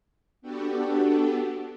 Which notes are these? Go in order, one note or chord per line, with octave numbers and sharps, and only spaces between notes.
B3 D4 F#4 G4 A4